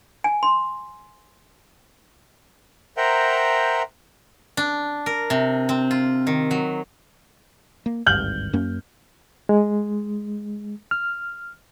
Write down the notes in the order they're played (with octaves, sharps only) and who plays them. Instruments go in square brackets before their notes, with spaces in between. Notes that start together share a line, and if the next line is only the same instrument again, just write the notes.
[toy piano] G#5
C6
[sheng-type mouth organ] A#4 C5 E5 F#5 G5 A#5
[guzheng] D4
A#4
C3
C4
F4
D#3
F#3
[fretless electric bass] A#3
[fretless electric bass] G#1 D2 G2 [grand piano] F6 G6 F#7
[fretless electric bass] F#2 A#3 C#4
[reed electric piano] G#3
F6